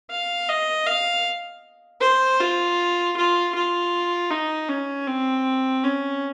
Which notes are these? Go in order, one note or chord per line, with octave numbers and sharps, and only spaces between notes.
F5
D#5
F5
C5
F4
F4
F4
D#4
C#4
C4
C#4